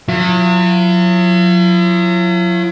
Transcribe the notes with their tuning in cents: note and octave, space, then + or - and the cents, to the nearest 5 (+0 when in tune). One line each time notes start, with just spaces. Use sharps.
F#3 -40 E4 +45